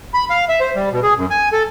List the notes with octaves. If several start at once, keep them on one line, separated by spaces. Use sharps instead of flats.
B5
F5
E5
C5
G3
B2
G#4
F#2
G#5
A4